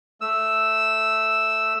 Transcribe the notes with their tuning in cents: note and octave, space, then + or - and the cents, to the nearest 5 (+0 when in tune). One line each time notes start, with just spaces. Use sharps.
A3 +0 E6 +0